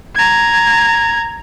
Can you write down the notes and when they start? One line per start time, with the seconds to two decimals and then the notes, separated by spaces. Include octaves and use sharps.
0.15 A#5 G#6